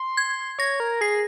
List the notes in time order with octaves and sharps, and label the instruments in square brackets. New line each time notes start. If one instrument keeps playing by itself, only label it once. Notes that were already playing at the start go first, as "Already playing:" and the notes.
Already playing: [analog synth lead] C6
[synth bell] G#6
[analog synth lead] C#5 [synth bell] A#6
[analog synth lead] A#4
[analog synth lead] G#4 [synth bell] C7